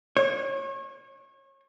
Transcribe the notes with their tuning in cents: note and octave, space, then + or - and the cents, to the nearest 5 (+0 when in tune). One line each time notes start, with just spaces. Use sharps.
C#5 -30